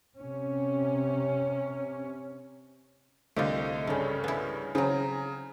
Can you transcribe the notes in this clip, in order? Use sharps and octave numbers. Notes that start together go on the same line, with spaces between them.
C3 C#4
C2 D3 A3 F4 G4 C5 D#5
G2 C#3 G3 A3 C#4
B3 E4
C#3 F#3 C4 G#5 A#5